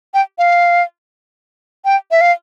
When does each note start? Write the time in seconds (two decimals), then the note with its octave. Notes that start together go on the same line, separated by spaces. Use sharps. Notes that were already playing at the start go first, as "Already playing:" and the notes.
0.14 G5
0.38 F5
1.85 G5
2.11 E5
2.21 F5